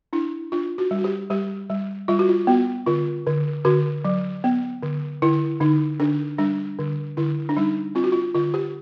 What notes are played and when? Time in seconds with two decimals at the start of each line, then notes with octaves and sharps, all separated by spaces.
0.13 D4 E4
0.52 D4 F4
0.78 F#4
0.91 G3
0.99 F#4
1.04 G4
1.30 G3 G4
1.70 G3
2.08 G3 F4
2.19 F#4
2.29 F4
2.47 B3 F#4
2.86 D3 F4
3.26 D3
3.65 D3 F#4
4.05 F#3
4.44 B3
4.83 D3
5.22 D3 E4
5.61 D3 D#4
6.00 D3 D4
6.38 G3 D4
6.79 D3
7.17 D3 E4
7.49 D4
7.57 G3 D#4
7.95 C4 F4
8.04 F#4
8.12 F4
8.34 D3 F4
8.54 G4